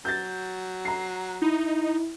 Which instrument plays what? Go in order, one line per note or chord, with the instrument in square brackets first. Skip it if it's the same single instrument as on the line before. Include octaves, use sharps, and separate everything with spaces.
[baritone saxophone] F#3 [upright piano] G6 A6
[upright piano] A#5 C7
[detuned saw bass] D#4 [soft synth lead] E4